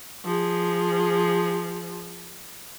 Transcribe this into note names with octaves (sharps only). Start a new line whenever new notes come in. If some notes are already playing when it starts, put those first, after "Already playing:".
F3 G#4